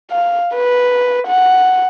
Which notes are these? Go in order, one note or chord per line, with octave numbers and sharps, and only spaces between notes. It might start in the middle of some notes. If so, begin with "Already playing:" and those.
F5
B4
F#5